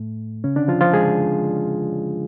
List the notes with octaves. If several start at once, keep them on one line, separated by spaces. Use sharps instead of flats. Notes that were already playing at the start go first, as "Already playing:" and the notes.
Already playing: A2 A3
C#3 C#4
D3 D4
F3 F4
F3 F4
G#3 G#4